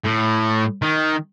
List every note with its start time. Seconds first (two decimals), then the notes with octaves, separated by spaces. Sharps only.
0.05 A2
0.82 D#3